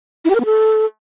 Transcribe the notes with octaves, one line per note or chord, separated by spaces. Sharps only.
E4
G4
A#4
B3
A4